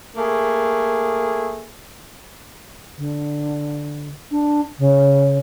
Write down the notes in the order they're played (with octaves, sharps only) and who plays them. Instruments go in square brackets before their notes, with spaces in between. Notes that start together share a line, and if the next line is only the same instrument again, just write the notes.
[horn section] A3 A#3 G#4
[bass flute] D3
D4
C#3